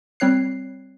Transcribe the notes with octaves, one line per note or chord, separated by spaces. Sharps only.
G3 C4 C#5 F#6 C7